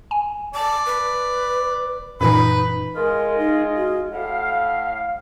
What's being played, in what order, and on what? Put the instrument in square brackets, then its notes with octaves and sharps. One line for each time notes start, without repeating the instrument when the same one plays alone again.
[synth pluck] G#5
[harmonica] D5 [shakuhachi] A5
[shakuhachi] B4
[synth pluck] F#2 A#2 E3 [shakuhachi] D#4 [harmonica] B4
[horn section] G#3 F4 D#5 [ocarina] A#4
[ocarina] D#4
F#4
[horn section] A2 F5 [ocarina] F#5